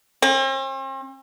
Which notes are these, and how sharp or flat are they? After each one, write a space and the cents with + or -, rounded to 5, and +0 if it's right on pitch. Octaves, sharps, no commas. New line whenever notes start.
C4 +45